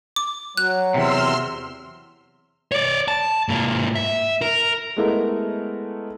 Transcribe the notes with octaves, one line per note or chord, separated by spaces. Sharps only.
D6
F#3 F#6
E2 C3 C6 E6 F6
C#5 D5
A5
G#2 A#3
E5
A#4
G#3 A3 B3 E4 A#4 D#5